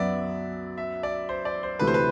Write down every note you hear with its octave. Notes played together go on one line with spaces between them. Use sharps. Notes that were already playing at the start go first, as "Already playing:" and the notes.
Already playing: F#2 F#3 B3 D5 E5
E5
D5
C5
D5
C5
D2 C3 E3 A3 B4
C5
B4